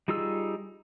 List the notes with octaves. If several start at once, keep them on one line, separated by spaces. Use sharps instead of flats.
G3 D#4 F4 G#4 E6